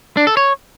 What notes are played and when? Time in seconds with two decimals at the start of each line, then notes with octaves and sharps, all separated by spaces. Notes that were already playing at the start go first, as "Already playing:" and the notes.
0.17 D4
0.27 A4
0.37 C#5